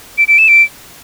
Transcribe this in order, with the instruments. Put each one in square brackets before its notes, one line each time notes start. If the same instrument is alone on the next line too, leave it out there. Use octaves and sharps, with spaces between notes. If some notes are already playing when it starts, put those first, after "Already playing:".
[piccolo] D7
D7
E7
D7